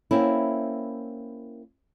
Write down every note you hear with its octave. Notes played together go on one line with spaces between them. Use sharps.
A#3 C4 C#4 E4